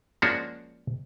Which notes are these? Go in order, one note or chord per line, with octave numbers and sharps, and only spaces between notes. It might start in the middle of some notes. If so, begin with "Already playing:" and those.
F3 G#3 A#3 C#4 D4 F#4